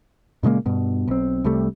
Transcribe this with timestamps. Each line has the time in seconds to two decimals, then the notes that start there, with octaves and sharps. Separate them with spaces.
0.43 A#2 C#3 G#3 A#3
0.66 G2 B2
1.08 B1 C4
1.44 C2 C3 G3 A3